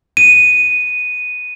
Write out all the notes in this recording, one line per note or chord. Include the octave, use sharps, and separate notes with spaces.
D#7